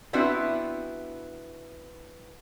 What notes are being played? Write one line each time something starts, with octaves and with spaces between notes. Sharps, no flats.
B3 C4 D4 E4 F#4 E5